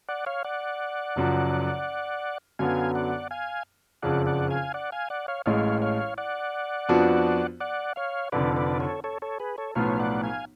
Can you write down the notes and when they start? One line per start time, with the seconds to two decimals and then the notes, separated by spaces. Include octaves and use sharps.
0.08 D5 F#5
0.26 C#5 F5
0.44 D5 F#5
1.16 F#1 F#2 F3
2.59 F#2 D3 F#3 B3 F5 G#5
2.95 D5 F#5
3.31 F5 G#5
4.02 F#1 F2 C#3 D5 F#5
4.26 D5 F#5
4.50 F5 G#5
4.74 D5 F#5
4.92 F5 G#5
5.10 D5 F#5
5.28 C#5 F5
5.46 A1 A2 G#3 C#5 F5
5.82 C#5 F5
6.18 D5 F#5
6.89 F2 F3 B3 D4 F#4
7.60 D5 F#5
7.96 C#5 F5
8.32 F1 F2 D3 B4 D5
8.56 B4 D5
8.80 A4 C#5
9.04 A4 C#5
9.22 A4 C#5
9.40 G#4 B4
9.58 A4 C#5
9.75 B1 A2 F3 B3 F4 C#5 F5
9.94 F5
10.00 D5 F#5
10.23 F5 G#5